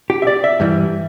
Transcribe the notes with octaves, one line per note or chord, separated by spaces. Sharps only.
G4
E5
D5
E5
G2 E3 G3